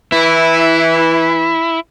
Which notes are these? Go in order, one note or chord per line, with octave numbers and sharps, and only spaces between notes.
E3 E4